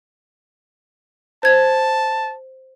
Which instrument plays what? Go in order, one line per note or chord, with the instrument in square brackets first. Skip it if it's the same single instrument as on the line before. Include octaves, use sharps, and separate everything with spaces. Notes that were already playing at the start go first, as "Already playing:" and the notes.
[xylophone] C5 G#6 [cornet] A5